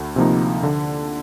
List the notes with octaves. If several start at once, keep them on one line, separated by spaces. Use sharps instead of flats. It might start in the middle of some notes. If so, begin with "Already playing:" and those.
Already playing: D2
C3 F3 A#3 D#4
D3